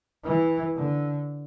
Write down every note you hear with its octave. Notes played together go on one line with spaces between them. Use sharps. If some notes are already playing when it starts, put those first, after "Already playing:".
E3
D3